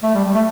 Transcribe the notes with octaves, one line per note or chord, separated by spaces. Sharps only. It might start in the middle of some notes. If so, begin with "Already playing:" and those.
A3
G3
G3
A3